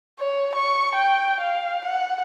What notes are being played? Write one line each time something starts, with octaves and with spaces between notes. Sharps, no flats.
C#5
C#6
G5
F5
F#5